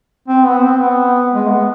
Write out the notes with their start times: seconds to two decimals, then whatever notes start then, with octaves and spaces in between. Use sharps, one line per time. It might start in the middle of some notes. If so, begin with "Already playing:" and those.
0.28 C4
0.46 B3
0.63 C4
0.80 B3
1.32 G#3
1.49 B3